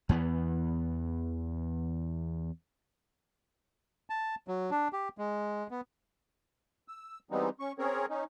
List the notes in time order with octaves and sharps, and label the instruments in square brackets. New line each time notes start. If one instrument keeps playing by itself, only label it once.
[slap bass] E2 E3 B3
[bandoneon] A5
F#3
D4
G4
G#3
B3
[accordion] E6
E3 G3 G#3 B3 C4 D#4
C#4 C#6
C4 C#4 G#4 A#4 C#5
C#4 D#4